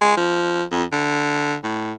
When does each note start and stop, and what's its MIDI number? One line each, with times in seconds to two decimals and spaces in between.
0.01 0.15 56
0.17 0.63 53
0.71 0.84 41
0.92 1.56 50
1.64 1.93 45